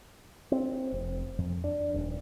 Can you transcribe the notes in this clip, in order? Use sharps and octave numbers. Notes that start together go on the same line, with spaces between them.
C4
F1
F2
D4
D#1